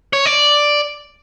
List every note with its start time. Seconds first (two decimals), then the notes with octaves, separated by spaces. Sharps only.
0.13 C#5
0.26 D5